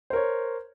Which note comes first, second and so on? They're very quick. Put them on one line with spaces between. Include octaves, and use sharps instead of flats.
C5 A#4 C#5